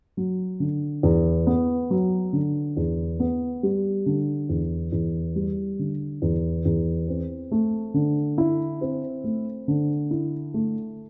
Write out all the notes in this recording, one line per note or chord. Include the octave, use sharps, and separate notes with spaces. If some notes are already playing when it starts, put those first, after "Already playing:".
F#3
D3
E2
B3
F#3
D3
E2
B3
G3
D3
E2
E2
G3
D3
E2
E2
C4
A3
D3
E4
C4
A3
D3
E4
A3